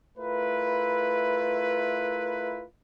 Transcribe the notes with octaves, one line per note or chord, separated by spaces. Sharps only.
A3 E4 F4 A#4 B4